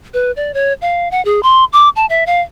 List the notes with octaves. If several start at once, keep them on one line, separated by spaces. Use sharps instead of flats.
B4
D5
C#5
F5
F#5
G#4
C6
D6
A5
E5
F5